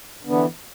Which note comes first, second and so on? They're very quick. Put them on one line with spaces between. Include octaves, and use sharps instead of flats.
D3 B3 E3